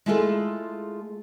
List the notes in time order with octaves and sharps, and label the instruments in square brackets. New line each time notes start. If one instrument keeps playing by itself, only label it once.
[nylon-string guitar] G#3 A3 E4 F4 G#4 A4